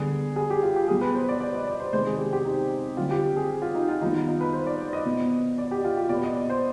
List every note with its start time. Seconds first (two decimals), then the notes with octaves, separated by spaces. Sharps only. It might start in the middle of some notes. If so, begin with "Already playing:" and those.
Already playing: D3 G3 B3 G#4
0.36 G#4
0.50 G4
0.63 F4
0.76 G4
0.88 B2 G3 B3 G#4
1.01 B4
1.15 C5
1.29 D5
1.40 D5
1.54 D#5
1.67 D5
1.80 C5
1.93 C3 D#3 G#3 C4 C5
2.07 G#4
2.19 G4
2.33 G4
2.45 D#4
2.97 D3 G3 C4 F4
3.11 G4
3.36 G#4
3.62 F4
3.75 D#4
3.89 F4
4.01 D#3 G3 B3 D#4
4.15 F4
4.28 D#4
4.41 B4
4.53 C5
4.67 D5
4.93 D#5
5.05 B2 B3
5.58 D5
5.71 G4
5.84 F4
5.97 G4
6.09 B2 B3 D5
6.23 D#5
6.36 D5
6.50 C5